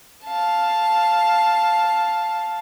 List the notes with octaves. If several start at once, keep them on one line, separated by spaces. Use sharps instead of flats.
F5 A5